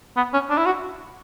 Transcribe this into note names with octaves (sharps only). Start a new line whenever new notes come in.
B3
C#4
D4
E4
F#4